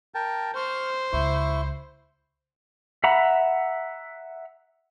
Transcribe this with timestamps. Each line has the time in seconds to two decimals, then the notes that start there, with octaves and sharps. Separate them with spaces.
0.15 A#4 G5 A5
0.55 C5 C#6 F6
1.13 C#2 E4 C#6
3.04 E5 F#5 A#5 B5